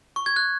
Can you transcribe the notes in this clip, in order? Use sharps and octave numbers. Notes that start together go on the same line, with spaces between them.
C#6
G#6
F#6